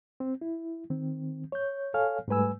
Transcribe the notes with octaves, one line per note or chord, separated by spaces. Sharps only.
C4
E4
D#3 C4
C#5 G6
A4 C#5 F5 G#5 F6
G#2 G3 A3 B4 G#5 E6